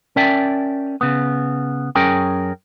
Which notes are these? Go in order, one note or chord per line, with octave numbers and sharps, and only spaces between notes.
C#4 A#4 D5 E5 G5 A5
C#3 B3
F#2 C#4 G#4 A#4 G5